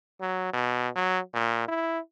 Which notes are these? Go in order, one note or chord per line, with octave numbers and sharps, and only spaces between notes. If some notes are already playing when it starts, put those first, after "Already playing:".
F#3
B2
F#3
A#2
E4